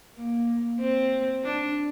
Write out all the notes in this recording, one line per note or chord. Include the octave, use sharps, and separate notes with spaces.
A#3
C4
D4